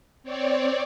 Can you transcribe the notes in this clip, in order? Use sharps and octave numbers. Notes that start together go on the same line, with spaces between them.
C4 C#5 D5